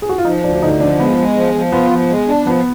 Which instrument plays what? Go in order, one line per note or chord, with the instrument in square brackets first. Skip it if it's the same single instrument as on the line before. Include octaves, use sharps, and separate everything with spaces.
[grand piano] G#4
F#4
F4
[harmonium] F3 [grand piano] D#4
[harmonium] D2 [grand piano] D4
[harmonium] D3 [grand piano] D#4
[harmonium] F3 [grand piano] D4
[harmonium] G#3 [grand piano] B3
[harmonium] G#3
F3
F3
[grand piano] B3 [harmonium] F4
[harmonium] F3
G#3
D4
[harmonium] F3 [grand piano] B3